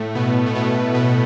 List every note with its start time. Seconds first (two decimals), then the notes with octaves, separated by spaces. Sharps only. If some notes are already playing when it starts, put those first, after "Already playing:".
Already playing: A2 A3
0.15 B2 B3
0.46 A3
0.55 B2 B3
0.95 B2 B3